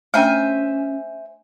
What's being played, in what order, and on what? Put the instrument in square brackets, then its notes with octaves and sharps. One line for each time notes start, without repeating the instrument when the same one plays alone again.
[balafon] A3 D4 G5 [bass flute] C#4 [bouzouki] C5 E5 G#5